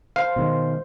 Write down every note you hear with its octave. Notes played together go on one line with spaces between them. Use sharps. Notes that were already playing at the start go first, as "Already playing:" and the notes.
C5 F5
B2 D#3 G#3